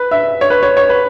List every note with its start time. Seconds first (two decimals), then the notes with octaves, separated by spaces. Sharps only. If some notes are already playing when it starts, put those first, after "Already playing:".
Already playing: B4
0.11 E5
0.41 C#5
0.50 B4
0.63 C#5
0.77 C#5
0.89 B4